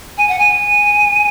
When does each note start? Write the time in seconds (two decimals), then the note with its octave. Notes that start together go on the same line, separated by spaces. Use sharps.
0.18 G#5
0.29 F#5
0.39 G#5